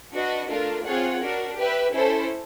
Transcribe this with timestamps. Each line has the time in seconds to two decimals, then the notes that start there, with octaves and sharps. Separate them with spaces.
0.13 D4 F#4 B4 D#5
0.49 A3 D4 F4 A#4
0.85 C4 F4 G#4 C#5 F#5
1.21 D4 F#4 A#4
1.57 G4 B4 E5
1.93 C#4 E4 A4 C5